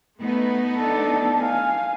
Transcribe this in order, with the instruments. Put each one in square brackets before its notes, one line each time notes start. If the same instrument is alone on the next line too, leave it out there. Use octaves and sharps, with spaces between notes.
[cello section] A3 B3 D#4
[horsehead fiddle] D4 A4
F5 G#5